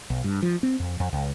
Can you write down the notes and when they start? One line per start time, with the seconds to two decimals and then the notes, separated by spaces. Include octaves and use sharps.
0.10 B1
0.24 G2
0.42 F3
0.63 C4
0.80 F2
1.00 F2
1.13 C#2